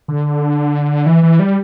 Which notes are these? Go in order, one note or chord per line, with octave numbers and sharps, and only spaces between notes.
D3
E3
E3
G3